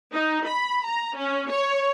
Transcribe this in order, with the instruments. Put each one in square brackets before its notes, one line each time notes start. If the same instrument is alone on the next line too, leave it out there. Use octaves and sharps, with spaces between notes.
[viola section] D#4
B5
A#5
C#4
C#5